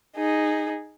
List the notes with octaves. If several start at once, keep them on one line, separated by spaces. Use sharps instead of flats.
D#4 G#4